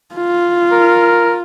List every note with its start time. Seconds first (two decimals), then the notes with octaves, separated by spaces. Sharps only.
0.15 F4
0.72 A#4